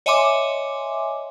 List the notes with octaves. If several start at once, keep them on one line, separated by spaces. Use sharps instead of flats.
C#5 D#5 E5 G#5 C6 D6